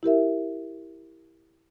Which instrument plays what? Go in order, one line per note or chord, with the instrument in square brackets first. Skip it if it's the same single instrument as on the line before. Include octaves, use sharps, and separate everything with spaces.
[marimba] E4 G4 A#4 E5